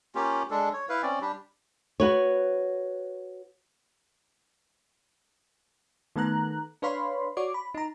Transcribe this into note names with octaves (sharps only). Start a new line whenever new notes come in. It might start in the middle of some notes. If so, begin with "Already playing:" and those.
A#3 C#4 F4 G4
G#3 D4 A4
C#5
E4 B4 F5
C4 C#4 D5
G3 D4 G4
F#4 B4 C#5
D#3 A3 B3 A#5 F#6
D4 B4 C#5 F5 B5 C6
F#4 C#5 D5 D6
B5
D#4 A#5